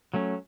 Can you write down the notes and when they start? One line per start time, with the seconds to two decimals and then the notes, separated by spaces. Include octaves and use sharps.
0.14 F#3 A3 C#4